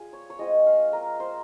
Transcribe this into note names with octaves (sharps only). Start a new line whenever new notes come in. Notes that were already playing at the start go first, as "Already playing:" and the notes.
Already playing: G3 F4 G#4
C#5
C#5
G#3 C4 F4 D#5
F5
A#4
C5